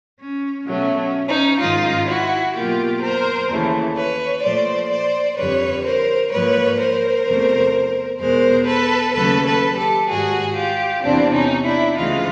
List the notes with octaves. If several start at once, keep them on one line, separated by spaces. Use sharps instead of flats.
C#4
B2 F#3 A3 C#4
C#4
C#4 D#4
G#2 D#3 G#3 D#4 F4
E4 F#4
B2 F#3 A#3 F4 G4
A#4 C5
D#2 C#3 E3 A3
B4 C#5
A#2 F3 A3 C5 D5
C5 D5
F2 D3 G3 B4 C#5
A#4 C5
G#2 F3 A#3 B4 C#5
A#4 C5
E2 C3 F3 A3
E2 B2 G#3 A#4 C5
A4 B4
D#2 C#3 F#3 A3 A4 B4
A4 B4
G4 A4
G#2 D#3 G3 F#4 G#4
F4 G4
E2 C3 E3 C4 D4
C#4 D#4
D4 E4
D2 C#3 E3 G#3 D#4 F4